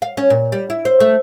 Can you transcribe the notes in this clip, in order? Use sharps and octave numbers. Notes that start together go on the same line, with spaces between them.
F5
C#4
A#2
G3
E4
C5
A3